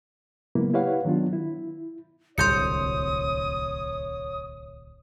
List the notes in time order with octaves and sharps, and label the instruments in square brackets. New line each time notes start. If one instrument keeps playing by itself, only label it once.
[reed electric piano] C#3 F#3 G#3 A#3 B3 E4
E4 G4 B4 C#5 F5 F#5
D#3 F#3 B3 D4 F4
E4
[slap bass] D1 C2 [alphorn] C#5 [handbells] C6 G6 C#7 [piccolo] D#6